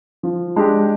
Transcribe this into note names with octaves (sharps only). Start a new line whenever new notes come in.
F3
G#3 D4 G4